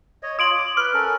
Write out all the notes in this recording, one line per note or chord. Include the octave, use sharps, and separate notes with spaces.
C#5 D#5
F4 C#5 D#6 D7 F#7
D6
B4 F6
C#4 A4 A#4